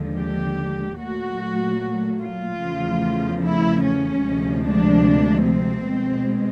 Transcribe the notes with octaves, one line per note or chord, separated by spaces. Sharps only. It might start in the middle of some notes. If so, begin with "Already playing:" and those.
Already playing: D#2 D3 F3 G#3
G4
A#2 F#3 A3 F#4
F4
E2 C#3 F3 A3
E4
C#4
D2 C3 F3 G#3
D4
C4
B2 G#3